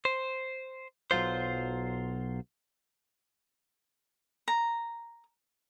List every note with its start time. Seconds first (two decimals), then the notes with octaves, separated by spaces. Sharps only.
0.05 C5
1.11 B1 G#2 F#3 F4 C5
4.48 A#5